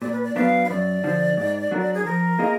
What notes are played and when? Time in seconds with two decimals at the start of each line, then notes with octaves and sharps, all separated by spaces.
0.02 A#2 D5
0.13 B4
0.23 D5
0.36 F#3 B3 D4 F5
0.65 B4
0.69 F#2 D5
1.04 D3 F3
1.37 G#2
1.71 F#3 D4 F#4 A#4
1.94 G#4
2.05 F3 A#4
2.39 A#3 F4 G#4 D#5